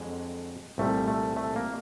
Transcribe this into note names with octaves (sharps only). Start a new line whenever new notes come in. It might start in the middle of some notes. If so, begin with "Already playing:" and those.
Already playing: F2 D3 F#3 G#3
C2 A#2 G3 A3
A3
A3
A#3